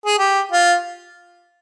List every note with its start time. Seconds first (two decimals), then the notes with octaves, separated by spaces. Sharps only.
0.06 G#4
0.19 G4
0.52 F4